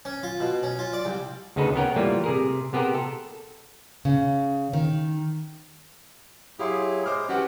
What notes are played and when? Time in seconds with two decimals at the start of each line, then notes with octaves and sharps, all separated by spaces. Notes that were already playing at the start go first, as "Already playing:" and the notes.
0.05 C#4
0.23 F4
0.40 B2
0.63 C#4
0.79 F4
0.93 D5
1.05 C2
1.56 D2 C#3 D#4 G#4 A4 B4
1.75 B3 C#4 A#4 C#5 F#5 G5
1.96 E3 G3 A3 A#3 F4
2.24 C3 G#4 A#4
2.73 C3 B3 G4 G#4 A#4 C5
2.94 A4
4.05 C#3
4.73 D#3
6.59 F#3 E4 G4 G#4 F5 C6
7.06 G#3 C5 D6 F6
7.29 E3 C#4 F#4 G4 F#5